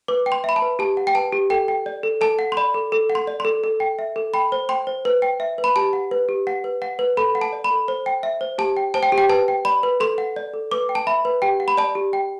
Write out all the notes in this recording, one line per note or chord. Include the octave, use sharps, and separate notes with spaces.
B4 D6
G5
C6
E5 B5
A5
B4
G4 A5
F#5
G5
B4 A5
G4
A4 G5
G5
D5
A4
A4 A5
F#5
C6
D5 B5
A4
A4
F#5
C6
D5
A4 C6
A4
G5
E5
A4
G5 B5
C5
G5 C6
C5
B4
G5
E5
B4
B5
G4 A5
F#5
B4
G4
F#5
B4
F#5
B4
A4 B5
F#5
A5
D5
B5
A4
C5
G5
E5
C5
G4 A5
G5
C5 A5
G5
G4
G5
B4 A5
G5
D5 B5
B4
A4 C6
F#5
D5
A4
B4 D6
G5
A5
E5 B5
B4
G4 G5
F#5
B5
D5 A5
G4
G5